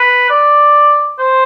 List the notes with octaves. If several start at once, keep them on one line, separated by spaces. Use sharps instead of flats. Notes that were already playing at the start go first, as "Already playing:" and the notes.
Already playing: B4
D5
C5